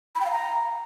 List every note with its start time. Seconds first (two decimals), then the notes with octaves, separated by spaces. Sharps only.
0.15 B5
0.20 G5
0.26 F5
0.31 A#5